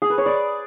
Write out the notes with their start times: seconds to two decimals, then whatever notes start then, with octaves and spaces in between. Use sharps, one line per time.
0.02 G#4
0.10 B4
0.18 C#5
0.26 D5